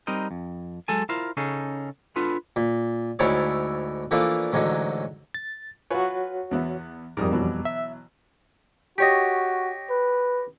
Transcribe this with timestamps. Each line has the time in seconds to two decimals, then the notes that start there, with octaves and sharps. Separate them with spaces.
0.07 G3 C4 D#4 A#4 D#5
0.31 F2
0.88 F#3 G#3 A4 G#5
1.09 E4 F4 A#4 C5 F5
1.37 C#3 C#4 D#4 G#4 A4
2.16 B3 D4 F4 A4 B4
2.56 A#2
3.19 D2 G#2 A3 E4 C#5 D5
4.11 E3 F3 A3 A#3 D4
4.53 A1 G#2 D3 F#3
5.34 A6
5.91 F4 F#4 B4 C#5 G#5
6.51 E2 B3 E5
7.17 F2 G#2 G3 A#4 D6 D#6
7.31 B2 E3 F#3
7.65 E5
8.98 F#4 G4 C#5 D#5
9.90 B4